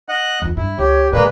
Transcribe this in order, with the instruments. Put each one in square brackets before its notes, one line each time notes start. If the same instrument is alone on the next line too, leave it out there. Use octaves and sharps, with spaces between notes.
[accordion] D#5 F#5 F#6
[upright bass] E2 F4
[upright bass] G2 [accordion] E4
[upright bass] C#2 [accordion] G4 [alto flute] C#5
[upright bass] A2 C#3 [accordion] G#3 A#3 B4 [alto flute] D5